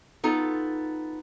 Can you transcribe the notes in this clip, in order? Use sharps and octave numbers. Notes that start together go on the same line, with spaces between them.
B3 D#4 F4 A4